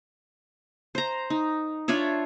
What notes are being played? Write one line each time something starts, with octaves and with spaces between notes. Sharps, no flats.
C5 A#5
D#4
D4 F4 C#5 E5